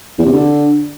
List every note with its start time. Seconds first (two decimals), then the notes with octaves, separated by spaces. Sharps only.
0.18 E2
0.26 C3
0.33 D3